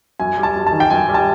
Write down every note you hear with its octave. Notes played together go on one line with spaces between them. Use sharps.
F#2 G#5
G3
A5
F#2
A5
D#3
G5
F#2 G#5
G3
A5